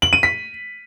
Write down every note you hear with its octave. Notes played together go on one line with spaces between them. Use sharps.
F#7
D#7
B6